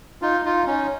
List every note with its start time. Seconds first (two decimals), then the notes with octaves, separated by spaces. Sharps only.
0.22 D#4 F4
0.45 D#4 F4
0.67 C#4 D#4